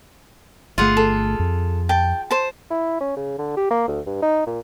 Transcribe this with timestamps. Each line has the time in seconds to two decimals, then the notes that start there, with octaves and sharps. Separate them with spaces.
0.78 G1 D3 A3 F4 G#4 F#5
0.97 A4
1.40 F2
1.89 G5 A5
2.31 C5 A5
2.70 E4
3.00 C#4
3.17 C#3
3.38 D3
3.57 G4
3.71 A#3
3.88 D2
4.06 G2
4.22 D#4
4.47 A#2